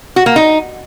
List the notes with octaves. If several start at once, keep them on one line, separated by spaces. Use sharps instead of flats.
F#4
A#3
D#4